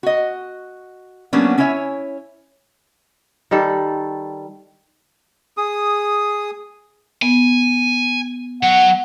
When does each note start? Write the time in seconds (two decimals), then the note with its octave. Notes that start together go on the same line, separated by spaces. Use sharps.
0.03 F#4 D#5
1.33 F#3 G3 A#3 B3 C#4 D4
1.58 C#4 D4 E4 C#5 E5 G#5
3.51 D#3 G3 A4
5.57 G#4 D#6
7.22 B3 G#5
8.63 F#3 C#5 F#5